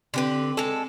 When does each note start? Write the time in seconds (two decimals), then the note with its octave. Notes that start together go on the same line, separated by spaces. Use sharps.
0.14 D3 C4 G4 B4
0.57 G#3 A4 G#6